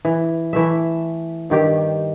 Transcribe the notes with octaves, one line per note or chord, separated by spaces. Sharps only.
E3
E3 A3 E5
G2 D#3 G4 G5